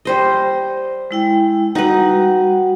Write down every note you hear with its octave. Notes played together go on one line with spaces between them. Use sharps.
G3 C5 D#5
G#3 E4 G5
G3 D#4 F#4 B4 F#5